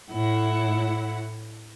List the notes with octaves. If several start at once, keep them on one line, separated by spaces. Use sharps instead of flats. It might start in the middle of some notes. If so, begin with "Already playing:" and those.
A2 E4 F#5